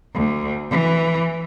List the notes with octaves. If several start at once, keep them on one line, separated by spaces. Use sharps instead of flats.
D2
E3